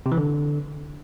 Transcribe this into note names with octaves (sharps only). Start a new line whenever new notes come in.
C3
E3
D3